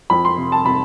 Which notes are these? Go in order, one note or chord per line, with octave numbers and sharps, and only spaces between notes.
F2 B5
C6
C3
A5
C3 B5